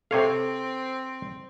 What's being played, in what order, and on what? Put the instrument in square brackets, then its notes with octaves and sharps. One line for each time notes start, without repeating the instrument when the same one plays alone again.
[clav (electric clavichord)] C3 C#5 F5 [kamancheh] C4 [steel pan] A4 C6